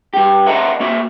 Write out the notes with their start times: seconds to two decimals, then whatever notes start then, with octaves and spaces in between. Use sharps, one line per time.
0.14 G2 G4
0.46 B4 D#5 E5 F#5 A5 A#5
0.80 A#3 F#4 E5